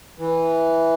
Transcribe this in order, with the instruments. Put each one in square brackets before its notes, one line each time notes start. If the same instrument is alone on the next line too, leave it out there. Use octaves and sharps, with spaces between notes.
[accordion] E3